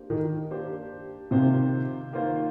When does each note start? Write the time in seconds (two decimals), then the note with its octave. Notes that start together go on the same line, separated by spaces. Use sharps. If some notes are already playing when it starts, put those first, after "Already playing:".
Already playing: A#3 D4 G4 C5
0.10 D#3
0.50 A#3 D4 G4 C5
1.31 C3 D#3 A#3 F4 C5
2.13 D#3 A#3 F4 C5